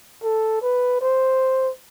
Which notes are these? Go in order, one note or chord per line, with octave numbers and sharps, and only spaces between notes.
A4
B4
C5